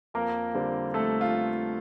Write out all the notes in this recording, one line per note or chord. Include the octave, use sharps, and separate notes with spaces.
F2 A#3 A#4
D3 G3 C4
F2 A3 A4
F4